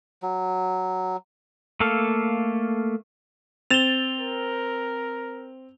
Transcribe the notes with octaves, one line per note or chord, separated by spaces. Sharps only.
F#3
A3 A#3 A4 F5
C4 A6 E7 F7 G7
A#4